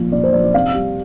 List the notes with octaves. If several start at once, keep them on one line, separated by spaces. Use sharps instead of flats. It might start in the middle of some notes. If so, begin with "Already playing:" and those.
Already playing: A#2 F3
A#2 D5
C5
F3 D5
D5
C3 F5
G3